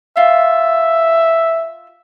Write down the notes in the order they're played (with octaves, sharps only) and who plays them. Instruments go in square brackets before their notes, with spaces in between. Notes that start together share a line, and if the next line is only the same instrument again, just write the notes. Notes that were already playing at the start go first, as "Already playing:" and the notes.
[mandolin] F4 [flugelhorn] E5